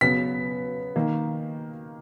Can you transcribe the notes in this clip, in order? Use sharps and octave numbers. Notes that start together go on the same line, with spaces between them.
C#3 F#3 B3 B6
D#3 A#3